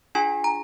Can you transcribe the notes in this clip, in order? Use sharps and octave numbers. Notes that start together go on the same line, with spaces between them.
D4 F4 G#4 G#5
A#5